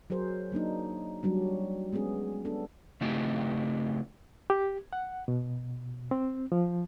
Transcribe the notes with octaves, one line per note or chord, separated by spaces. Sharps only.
F#3 G#4 A#4 C5
F#3 A#3 D4 D#4
F#3 G3 D4
G#3 B3 C#4 G#4
B3 D4 A4
C#3 A3 C4 D#4 E4 G4
G4
F#5
B2
C4
F3